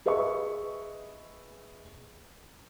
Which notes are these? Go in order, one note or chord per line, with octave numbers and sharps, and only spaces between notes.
G#4 B4 D#5 E5 B5 C#6